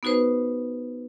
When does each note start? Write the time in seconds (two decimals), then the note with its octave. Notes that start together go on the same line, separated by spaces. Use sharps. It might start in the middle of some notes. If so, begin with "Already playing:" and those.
0.03 B3 D#4 F#4 B4 C5